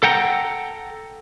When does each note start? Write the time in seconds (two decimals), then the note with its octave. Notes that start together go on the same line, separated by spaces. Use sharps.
0.03 A4 F#5 G5 A#5